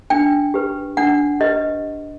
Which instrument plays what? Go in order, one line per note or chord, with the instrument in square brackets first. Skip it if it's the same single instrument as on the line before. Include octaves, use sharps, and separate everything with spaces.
[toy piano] D4 G5
G4 B4
D4 F#5
G4 B4 D#5